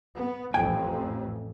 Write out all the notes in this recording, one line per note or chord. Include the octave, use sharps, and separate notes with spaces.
B3
A1 F2 G5 G#5